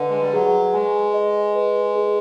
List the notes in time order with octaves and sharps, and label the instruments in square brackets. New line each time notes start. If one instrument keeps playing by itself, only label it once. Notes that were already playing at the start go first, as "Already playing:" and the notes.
Already playing: [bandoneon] D3 [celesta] B4 D#5
[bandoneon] G#3
G3
[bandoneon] F#3 [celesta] G#4
[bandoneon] G#3 [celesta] G#5
[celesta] D#5
B4
G#4